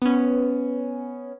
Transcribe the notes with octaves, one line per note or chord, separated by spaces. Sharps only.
B3 C#4